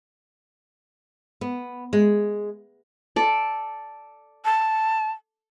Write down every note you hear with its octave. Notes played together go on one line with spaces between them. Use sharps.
B3
G#3
A4 D5
A5